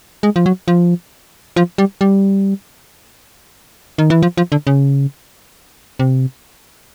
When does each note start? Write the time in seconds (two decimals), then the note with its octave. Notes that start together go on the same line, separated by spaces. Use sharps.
0.23 G#3
0.36 F3
0.46 F#3
0.68 F3
1.56 F3
1.78 G3
2.01 G3
3.98 D#3
4.10 E3
4.22 F3
4.37 F3
4.52 D3
4.67 C#3
5.99 C3